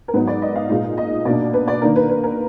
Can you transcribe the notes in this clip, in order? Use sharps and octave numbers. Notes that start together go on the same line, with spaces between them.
A#4
G#2 F#3 B3 D#4 B4
D5
D#5
F5
A#2 G#3 D#4
D#5
B2 A#3 D4 D5
B4
D5
D#3 A#3 D4 A#4
B4
B4
A#4